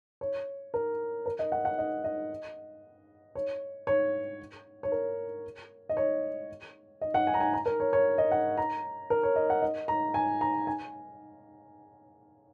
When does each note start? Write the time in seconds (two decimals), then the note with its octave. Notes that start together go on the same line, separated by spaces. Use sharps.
0.21 C#5
0.74 A#4
1.26 A#4
1.39 D#5
1.52 F#5
1.65 F#5
1.78 D#5
2.04 D#5
3.35 C#5
3.87 C#5
4.83 C#5
4.92 A#4
5.89 D#5
5.97 C#5
7.01 D#5
7.14 F#5
7.27 G#5
7.34 A#5
7.40 G#5
7.53 A#5
7.66 A#4
7.80 C#5
7.93 C#5
8.18 D#5
8.31 F#5
8.57 A#5
9.10 A#4
9.23 C#5
9.36 D#5
9.50 F#5
9.62 D#5
9.88 A#5
10.14 G#5
10.41 A#5
10.67 G#5